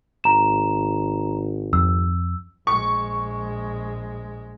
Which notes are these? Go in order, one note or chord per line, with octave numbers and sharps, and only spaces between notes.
G#1 A#5 E7
F2 E6
A#1 G#3 C#6